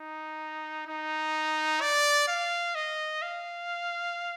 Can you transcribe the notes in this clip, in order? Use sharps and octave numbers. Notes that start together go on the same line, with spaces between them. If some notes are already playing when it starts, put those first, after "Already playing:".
Already playing: D#4
D#4
D5
F5
D#5
F5